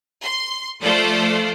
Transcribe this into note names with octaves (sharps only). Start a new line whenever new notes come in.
C6
F3 A3 F4 A4 C5 D5